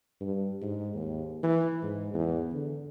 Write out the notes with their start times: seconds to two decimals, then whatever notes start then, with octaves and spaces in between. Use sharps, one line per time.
0.21 G2
0.62 G#2
0.94 D#2
1.43 E3
1.82 G#2
2.14 E2
2.52 D3